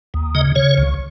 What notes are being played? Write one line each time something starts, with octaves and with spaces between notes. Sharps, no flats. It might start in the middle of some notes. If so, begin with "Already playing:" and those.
D#2
C#3 D#5
C#3 C#5
C#2